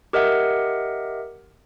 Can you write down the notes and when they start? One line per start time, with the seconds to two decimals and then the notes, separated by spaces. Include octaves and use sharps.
0.13 G4 A#4 D#5 E5 F#5